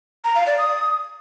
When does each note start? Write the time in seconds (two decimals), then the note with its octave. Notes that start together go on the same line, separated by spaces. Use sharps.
0.24 A#5
0.35 F5
0.47 D5
0.58 D#6